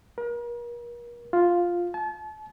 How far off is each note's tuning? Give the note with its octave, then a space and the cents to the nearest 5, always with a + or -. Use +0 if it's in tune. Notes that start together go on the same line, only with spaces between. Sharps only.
A#4 +40
F4 +0
A5 -35